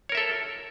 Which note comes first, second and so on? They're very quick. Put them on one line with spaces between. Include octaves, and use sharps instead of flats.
C#5 A#4 E5 A4